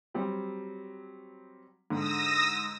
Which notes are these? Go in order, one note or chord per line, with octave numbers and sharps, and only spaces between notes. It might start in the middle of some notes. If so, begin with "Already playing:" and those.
F#3 G3 C4
G#2 D3 D#6 E6 A#6